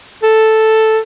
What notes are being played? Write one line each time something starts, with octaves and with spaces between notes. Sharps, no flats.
A4